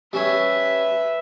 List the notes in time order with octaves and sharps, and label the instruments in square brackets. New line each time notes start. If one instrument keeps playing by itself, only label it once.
[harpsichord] G3 C#4 C#5 [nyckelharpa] B4 E5